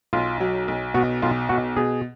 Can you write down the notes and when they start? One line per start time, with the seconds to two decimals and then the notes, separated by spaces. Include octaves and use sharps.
0.13 B1 F4
0.40 F#3
0.68 B1
0.94 B2 F#4
1.22 B1 F4
1.49 B2 F#4
1.76 B2 G#4